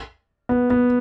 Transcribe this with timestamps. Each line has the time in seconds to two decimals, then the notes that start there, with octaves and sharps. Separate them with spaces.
0.49 B3
0.70 B3